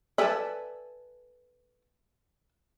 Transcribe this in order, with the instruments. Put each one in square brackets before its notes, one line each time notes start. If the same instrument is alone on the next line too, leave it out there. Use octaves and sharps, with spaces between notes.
[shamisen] A4 B4 D5 [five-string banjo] E5 G#5 A5